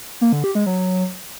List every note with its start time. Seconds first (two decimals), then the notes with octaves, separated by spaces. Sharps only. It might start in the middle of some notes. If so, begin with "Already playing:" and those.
0.21 A#3
0.33 D3
0.44 G4
0.55 G#3
0.66 F#3